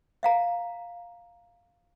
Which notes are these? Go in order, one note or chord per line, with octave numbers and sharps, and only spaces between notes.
E5 F5 A#5